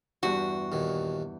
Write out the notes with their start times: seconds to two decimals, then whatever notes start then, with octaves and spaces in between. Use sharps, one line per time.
0.23 E2 G2 E4 F#4 C5
0.72 D#2 A#2 D#3